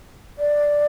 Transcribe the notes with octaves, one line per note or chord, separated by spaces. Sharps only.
D5